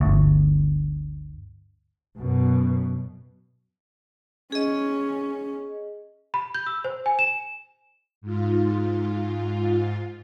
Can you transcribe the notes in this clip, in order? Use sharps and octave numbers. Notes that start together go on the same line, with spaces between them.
G1 D2
F#2 B2
C#4 G#4 D#5
B5
G6
E6
C5
G#5
E7
G#2 F4